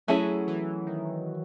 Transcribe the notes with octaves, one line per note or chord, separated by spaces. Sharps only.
F#3 A3 C#4 E4 G#4
E3
D#3